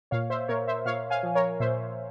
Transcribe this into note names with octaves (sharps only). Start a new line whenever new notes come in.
A#2 C#5 F5
C5 E5
A#2 A#4 C#5
C5 E5
A#2 C#5 F5
F5 G#5
F3
A#4 C#5
A#2 C5 E5